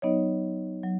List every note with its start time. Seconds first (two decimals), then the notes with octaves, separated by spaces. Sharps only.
0.02 F#3 B3 D#4 C#5 D#5
0.83 F#3